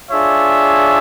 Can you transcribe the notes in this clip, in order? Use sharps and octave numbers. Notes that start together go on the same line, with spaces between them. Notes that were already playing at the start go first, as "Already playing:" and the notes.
D4 F4 G#4 C#5 E5